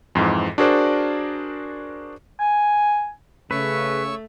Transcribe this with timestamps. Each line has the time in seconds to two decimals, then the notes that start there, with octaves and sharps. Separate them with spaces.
0.15 F2 G#2 E3
0.58 D4 F#4 G#4 A#4 C5 D5
2.40 G#5
3.51 C#3 A3 B4 C#5 C#6 E6